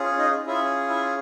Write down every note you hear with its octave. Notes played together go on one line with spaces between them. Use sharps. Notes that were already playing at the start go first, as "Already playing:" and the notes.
Already playing: C#4 F4 G#4
D#4 D#5
C#4 E4 F4 G#4 E5
E4 E5